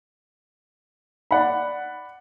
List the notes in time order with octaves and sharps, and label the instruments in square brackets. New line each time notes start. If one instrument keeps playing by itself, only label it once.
[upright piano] D5 F#5 B5